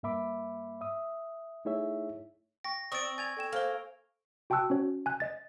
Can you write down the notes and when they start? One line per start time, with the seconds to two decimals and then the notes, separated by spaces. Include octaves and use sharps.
0.03 G2 A#3 E5 B5 D6
0.81 E5 D#6
1.65 A3 D#4 E4 G#4 C#5 E5
2.64 G5 C#6 A#6
2.92 C4 D5 C#6 D#6 E6 A6 D7
3.18 G#5 G#6 A6 F7
3.37 A4 G5 E7
3.53 A#3 A4 C5 G7
4.50 F#4 G5 A5 C#6 E6 F#6
4.70 C#4 F#4 C#5
5.06 G#5 F#6
5.20 D#5 A6